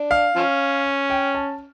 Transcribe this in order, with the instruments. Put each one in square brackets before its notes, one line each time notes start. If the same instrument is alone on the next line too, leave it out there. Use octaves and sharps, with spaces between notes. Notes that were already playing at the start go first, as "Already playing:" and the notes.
Already playing: [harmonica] D4
[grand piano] F5
[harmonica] F3 C#4
[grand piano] G5
A5